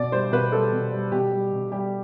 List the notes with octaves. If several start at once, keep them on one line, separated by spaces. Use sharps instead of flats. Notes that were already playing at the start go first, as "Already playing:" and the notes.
Already playing: B2 D5
G3 C5
B2 B4
G3 A4
B2
G3
B2 G4
G3
B2
G3 G4